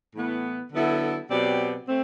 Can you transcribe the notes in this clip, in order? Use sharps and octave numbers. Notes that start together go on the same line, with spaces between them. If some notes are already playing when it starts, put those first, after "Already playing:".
A2 E3 B3
D3 F#3 B3 E4 A4
B2 F#3 C4 G4 D5
A3 C4